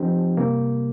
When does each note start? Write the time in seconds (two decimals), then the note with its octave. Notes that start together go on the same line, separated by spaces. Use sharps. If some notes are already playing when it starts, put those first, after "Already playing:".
Already playing: F3 C4 D#4 G4
0.37 C3 G3 A#3